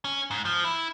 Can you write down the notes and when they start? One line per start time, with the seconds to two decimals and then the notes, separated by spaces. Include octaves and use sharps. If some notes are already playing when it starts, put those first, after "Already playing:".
0.04 C#4
0.31 G#2
0.45 F3
0.64 E4